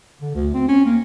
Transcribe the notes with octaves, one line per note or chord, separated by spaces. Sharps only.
D3
D2
C4
C#4
A#3